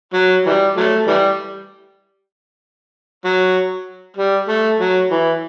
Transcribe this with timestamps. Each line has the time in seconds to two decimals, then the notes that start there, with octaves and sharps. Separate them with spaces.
0.14 F#3
0.46 E3 G3
0.77 F#3 A3
1.07 E3 G3
3.25 F#3
4.17 G3
4.48 A3
4.80 F#3
5.11 E3